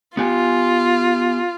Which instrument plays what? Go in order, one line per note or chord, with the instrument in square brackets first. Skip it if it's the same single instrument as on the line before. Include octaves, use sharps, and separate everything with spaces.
[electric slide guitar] B3 G4 G#5 [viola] F4